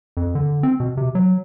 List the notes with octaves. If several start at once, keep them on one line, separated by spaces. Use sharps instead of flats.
F2
D3
C4
B2
C3
F#3